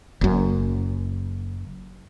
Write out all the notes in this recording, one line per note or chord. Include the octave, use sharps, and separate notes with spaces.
F#1 F#2